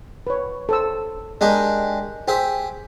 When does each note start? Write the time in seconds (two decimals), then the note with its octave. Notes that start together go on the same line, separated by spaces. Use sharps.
0.27 B4 C#5
0.69 A4 C5 E6
1.41 G#3 D4 G4 A#4 D#5
2.28 G4 G#4 C5 E5